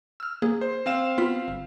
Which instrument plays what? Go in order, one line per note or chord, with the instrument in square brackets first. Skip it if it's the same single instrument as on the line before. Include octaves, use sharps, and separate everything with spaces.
[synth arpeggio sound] E6 F6
A#3 G#4
[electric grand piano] C5
C4 F5 E7
[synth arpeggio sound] B3 F4 B6
G1